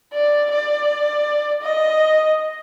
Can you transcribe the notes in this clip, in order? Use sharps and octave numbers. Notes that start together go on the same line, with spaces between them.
D5
D5
D#5